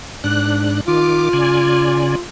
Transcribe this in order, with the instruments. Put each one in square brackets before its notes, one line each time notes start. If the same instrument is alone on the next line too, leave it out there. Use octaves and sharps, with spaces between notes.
[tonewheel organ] G#2 D4 F#6
[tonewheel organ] D#3 D6 [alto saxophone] F4
[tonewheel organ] C#3 D5 G#5